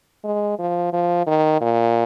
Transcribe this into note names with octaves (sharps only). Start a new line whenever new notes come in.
G#3
F3
F3
D#3
A#2